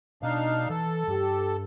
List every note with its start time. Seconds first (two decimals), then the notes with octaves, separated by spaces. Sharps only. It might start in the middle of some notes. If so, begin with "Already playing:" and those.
0.23 B2 D4 D#4 F5
0.70 E3 A4
1.08 G2 G4